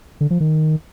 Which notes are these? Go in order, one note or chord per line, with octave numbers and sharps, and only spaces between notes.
D3
F3
D#3